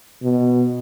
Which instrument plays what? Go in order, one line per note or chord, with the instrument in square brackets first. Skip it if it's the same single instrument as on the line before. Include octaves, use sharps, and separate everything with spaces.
[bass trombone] B2